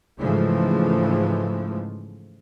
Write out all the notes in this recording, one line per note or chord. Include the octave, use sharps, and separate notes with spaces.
G#2 C#3 E3 F3 G#3 A3